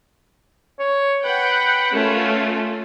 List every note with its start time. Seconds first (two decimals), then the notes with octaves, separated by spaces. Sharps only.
0.79 C#5
1.24 B4 F#5 G5
1.91 A3 C#4 F4